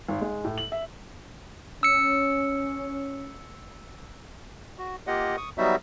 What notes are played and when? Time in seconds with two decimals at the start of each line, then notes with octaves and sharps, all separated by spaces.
0.08 G#1
0.21 G#3
0.45 A2
0.58 F#7
0.72 E5
1.83 C#4 E6 C#7
4.78 F#4
5.07 A#3 F4 G4 D#5 F#5
5.37 C#6 D#6
5.58 F#3 G3 B3 D#4 F#4 E5